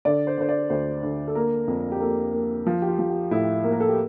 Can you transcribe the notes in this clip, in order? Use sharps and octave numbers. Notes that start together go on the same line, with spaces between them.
D3 D5
C5
D3 C5
D5
D2 C5
D3
A4
A#3 A#4
F2
G4
A#3 A4
A#3
F3
G4
F4
F3
G4
A2 E4
A#3
A#4
A4
G4